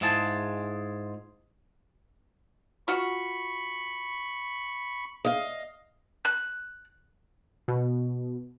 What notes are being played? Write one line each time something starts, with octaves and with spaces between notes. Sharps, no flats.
G#2 E4 F4 G#4 A5
F4 F#4 B5 C#6
D#5 F5
F#6
B2